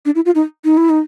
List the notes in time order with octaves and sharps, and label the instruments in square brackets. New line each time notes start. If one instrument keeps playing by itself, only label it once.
[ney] D4
E4
F4
D#4
D#4
E4
D#4